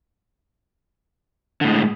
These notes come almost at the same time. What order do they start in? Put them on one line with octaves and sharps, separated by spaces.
D3 A2 G#3